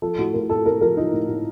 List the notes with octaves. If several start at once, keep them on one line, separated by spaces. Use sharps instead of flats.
F3 A4
A2 F#4
A2 A#4
A2 A4
A2 A#4
F3 A#4
F3 D#4
A2
A2